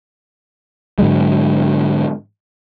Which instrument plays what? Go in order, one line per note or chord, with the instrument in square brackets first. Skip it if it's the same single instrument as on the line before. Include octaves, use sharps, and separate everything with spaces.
[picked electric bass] G#2 D3 F#3 G#3